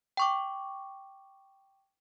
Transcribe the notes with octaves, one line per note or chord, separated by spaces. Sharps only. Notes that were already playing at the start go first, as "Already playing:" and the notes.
G5 C#6 D6